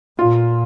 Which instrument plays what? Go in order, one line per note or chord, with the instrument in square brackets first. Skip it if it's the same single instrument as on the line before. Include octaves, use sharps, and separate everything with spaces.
[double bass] A#2 [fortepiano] F4